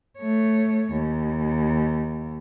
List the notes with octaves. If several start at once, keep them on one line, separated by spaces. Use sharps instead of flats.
A3 C#5
D#2